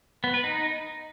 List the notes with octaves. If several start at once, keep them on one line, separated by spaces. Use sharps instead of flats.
B3
B4
D#4